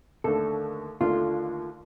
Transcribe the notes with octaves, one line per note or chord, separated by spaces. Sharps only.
D#2 D3 A3 D4 A4
D#2 D3 A3 D4 F4